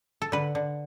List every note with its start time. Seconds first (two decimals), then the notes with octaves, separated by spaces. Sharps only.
0.22 A4
0.32 D3 B4
0.55 D3